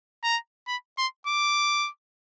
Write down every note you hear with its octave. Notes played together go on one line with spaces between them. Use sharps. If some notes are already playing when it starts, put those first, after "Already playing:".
A#5
B5
C6
D6